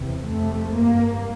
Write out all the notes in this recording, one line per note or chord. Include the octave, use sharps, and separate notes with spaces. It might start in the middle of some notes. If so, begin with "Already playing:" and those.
Already playing: E2 C3
F2 C3 A3
G2 A#3